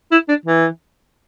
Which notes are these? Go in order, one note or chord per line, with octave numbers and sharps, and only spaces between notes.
E4
D4
E3